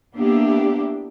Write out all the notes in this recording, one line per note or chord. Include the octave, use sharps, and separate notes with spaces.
A#3 B3 D4 E4 G4